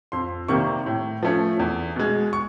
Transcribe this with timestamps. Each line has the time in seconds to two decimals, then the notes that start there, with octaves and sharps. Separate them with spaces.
0.12 F2 C6
0.48 C3 D#3 G3 A#3 C#6
0.86 A2
1.23 F3 A3 C#4
1.59 E2
1.96 B2 G#3
2.33 C#6